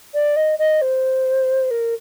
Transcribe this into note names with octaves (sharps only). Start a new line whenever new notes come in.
D5
D#5
D#5
C5
A#4